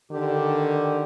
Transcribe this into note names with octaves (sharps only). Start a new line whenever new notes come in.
D3 D#3 G4